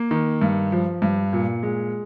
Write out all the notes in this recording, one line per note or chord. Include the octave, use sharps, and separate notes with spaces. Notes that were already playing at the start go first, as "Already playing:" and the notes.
Already playing: A#3
D#3
G2
F3
G2
A#2
G#3